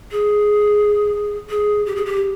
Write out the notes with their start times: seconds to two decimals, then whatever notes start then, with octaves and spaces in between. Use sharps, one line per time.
0.12 G#4
1.50 G#4
1.86 G4
1.96 G#4
2.06 G4